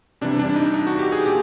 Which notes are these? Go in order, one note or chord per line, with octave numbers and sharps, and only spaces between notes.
C3 E3 G3 D4
D4
D#4
D#4
F#4
G4
G#4
A#2 G4